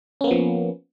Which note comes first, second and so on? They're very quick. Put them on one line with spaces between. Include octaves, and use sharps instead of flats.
C#4 A#3 B3 F3